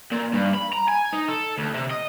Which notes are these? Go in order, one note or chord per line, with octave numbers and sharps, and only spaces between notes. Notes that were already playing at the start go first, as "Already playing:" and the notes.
A#2
G2
B5
A#5
G#5
D#4
A4
D2
C3
D#5